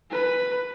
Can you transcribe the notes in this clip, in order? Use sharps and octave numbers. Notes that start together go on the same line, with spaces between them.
B4